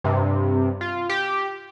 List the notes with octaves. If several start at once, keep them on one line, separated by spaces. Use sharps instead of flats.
G2 C3
F4
G4